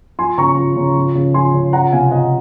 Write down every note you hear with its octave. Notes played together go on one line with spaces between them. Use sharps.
F3 G#5 C6
C#3 A#5 C#6
F3
C#3
F3
C#3
F3 G#5 C6
C#3
F3 F#5 A#5
C3 F5 G#5
F3 D#5 F#5